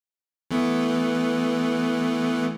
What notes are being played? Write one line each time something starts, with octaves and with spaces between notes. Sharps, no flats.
E3 A3 B3